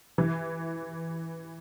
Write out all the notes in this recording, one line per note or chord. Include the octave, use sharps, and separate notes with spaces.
E3